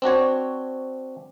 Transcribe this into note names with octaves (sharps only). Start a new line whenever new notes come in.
C4 D4 F#4 C#5